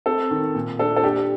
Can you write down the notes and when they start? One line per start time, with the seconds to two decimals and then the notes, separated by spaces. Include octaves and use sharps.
0.06 C4 A4
0.31 D#3
0.55 A#2
0.79 D4 A4
0.96 A4
1.04 D4 G4